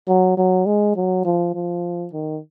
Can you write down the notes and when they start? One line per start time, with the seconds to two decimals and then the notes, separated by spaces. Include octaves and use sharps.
0.08 F#3
0.37 F#3
0.66 G#3
0.96 F#3
1.25 F3
1.55 F3
2.13 D#3